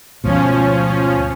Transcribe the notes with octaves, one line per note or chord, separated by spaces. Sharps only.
D2 G#2 B2 F3 C#4